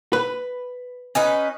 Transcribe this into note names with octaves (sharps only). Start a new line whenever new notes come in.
B4
C#4 D#4 B4